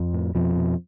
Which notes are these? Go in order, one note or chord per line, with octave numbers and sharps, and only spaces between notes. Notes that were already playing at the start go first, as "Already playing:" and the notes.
Already playing: F2 F3
A2
F2 B2 F3
B2